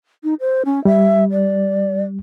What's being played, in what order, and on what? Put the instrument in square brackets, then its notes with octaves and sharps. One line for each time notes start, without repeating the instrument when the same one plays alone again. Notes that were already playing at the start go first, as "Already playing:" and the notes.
[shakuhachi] D#4
C5
C#4
[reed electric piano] G3 [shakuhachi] E5
[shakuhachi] D5